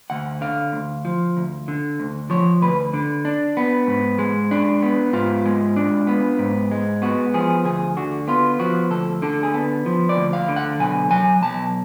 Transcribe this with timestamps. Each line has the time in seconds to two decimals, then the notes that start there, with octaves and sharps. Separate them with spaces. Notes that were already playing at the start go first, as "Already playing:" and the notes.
0.10 D2 F#5
0.41 D3 F5
0.73 D2
1.05 F3
1.37 D2
1.68 D3
2.00 D2
2.30 F3 C#5
2.62 D2 B4
2.94 D3
3.25 D4
3.57 B3
3.87 G#2
4.19 G#3
4.51 D4
4.82 B3
5.13 G#2 F4
5.46 G#3
5.76 D4
6.07 B3
6.39 G#2
6.71 G#3
7.02 B3 F#4
7.34 F3 G#4
7.65 D2 G#4
7.97 D3 F#4
8.28 B3 F4
8.59 F3 F#4
8.91 D2 A4
9.22 D3 A4
9.43 G#4
9.54 B3 A4
9.86 F3
10.09 D5
10.17 D2
10.33 F5
10.48 D3
10.56 F#5
10.80 B1 G#5
11.11 F#3 G#5
11.43 B1 A5